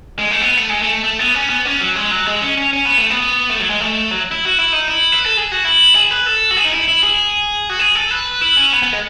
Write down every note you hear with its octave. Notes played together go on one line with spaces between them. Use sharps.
G#3
A3
B3
A3
G#3
A3
A3
B3
C#4
B3
C#4
F#3
G#3
F#3
G#3
C#4
C#4
C#4
B3
A3
B3
A3
F#3
G#3
A3
F#3
E4
F#4
E4
D#4
E4
B4
A4
G#4
F#4
E4
G#4
B4
A4
F#4
G#4
D#4
E4
E4
G#4
F#4
G#4
A4
B4
E4
C#4
B3
B3
G#3